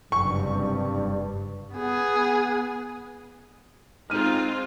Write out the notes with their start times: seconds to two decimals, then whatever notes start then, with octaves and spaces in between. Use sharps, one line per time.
0.12 F#1 G2 C3 C#6
1.75 B3 G#4
4.10 G#3 C4 D#4 F4 F6 D#7